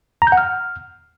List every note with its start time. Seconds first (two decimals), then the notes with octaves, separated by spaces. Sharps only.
0.22 A#5
0.27 G6
0.32 F#5
0.37 F6